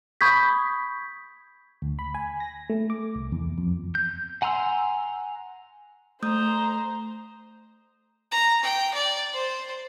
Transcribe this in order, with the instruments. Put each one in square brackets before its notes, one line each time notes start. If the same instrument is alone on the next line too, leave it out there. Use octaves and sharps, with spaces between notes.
[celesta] B5 C#6 D#6 G6 G#6 B6
[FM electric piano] D2
B5
G#5
A#6
A3
D6
C2
E2
F2
[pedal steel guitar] G6
F#5 G#5 A#5 C6 E6
[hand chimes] A3 D#6 G6 [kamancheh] C5 A#5
[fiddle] A#5
G5
D5
C5